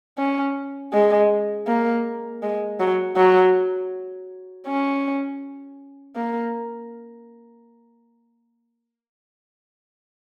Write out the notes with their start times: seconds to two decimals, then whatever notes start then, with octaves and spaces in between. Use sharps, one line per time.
0.18 C#4
0.93 G#3
1.67 A#3
2.43 G#3
2.80 F#3
3.17 F#3
4.67 C#4
6.16 A#3